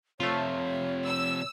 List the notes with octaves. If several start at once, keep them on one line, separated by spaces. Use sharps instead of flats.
C3 F3 A3 F4 C#5
E6